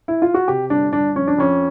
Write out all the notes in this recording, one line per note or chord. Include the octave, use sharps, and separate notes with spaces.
E4
F4
F#4
C3 G4
G1 D4
G1 D4
F2 C#4
D4
F2 C#4